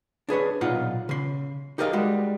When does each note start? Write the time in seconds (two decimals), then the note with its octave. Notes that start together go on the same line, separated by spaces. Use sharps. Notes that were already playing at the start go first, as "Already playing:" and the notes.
0.29 D4 G#4 B4 C#5
0.61 B1 A#2 D#4 F4 F5 F#5
1.09 C#3 C6
1.78 D#4 G4 G#4 A#4 D#5 F5
1.93 G3 G#3 F#4